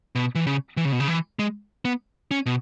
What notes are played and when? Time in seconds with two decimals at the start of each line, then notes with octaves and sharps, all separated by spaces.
0.15 B2
0.35 E3
0.47 C#3
0.77 E3
0.85 C#3
0.92 B2
1.00 C#3
1.08 E3
1.39 G#3
1.85 B3
2.31 C#4
2.46 B2